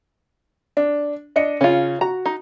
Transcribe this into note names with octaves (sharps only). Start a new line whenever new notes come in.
D4
D4 D#5 C#7
C#3 C#4 F4
F#4 A#5
D#4